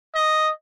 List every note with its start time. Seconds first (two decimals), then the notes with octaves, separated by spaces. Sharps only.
0.15 D#5